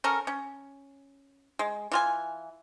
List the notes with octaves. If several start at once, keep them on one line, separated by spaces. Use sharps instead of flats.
C#4 A4 A#4
C#4
G#3
E3 F4 G#5